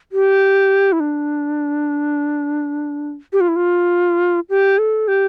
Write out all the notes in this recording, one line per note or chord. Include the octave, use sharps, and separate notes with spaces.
G4
E4
D4
G4
F4
E4
F4
G4
A4
G4